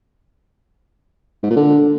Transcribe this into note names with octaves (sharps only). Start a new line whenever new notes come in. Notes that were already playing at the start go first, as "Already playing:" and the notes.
G#2
A#2
D3